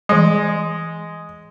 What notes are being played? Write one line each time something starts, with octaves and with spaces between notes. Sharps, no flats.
E3 G3 G#3